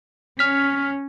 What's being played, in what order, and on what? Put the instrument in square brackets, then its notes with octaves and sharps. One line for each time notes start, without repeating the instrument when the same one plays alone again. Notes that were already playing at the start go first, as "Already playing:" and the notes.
[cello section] C#4 [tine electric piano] F6 B6